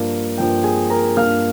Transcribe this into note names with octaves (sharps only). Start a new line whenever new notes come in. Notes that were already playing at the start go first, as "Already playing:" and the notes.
Already playing: G2 F3 A#3 F5
G2 F3 A#3 G5
G#4 G#5
A#4 A#5
G2 F3 A#3 F5 F6